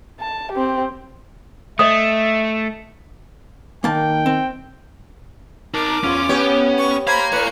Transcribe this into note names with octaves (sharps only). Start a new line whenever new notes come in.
A5
C4 G4
A3 D#5 E5 D#6
D#3 A#3 G5 A5
C4
D#4 A#4 A5 D6
E2 C#4 F4
B3 G4 C#5
C#6
C5 F5 A#5 B5 G#6
A2 B4 C#7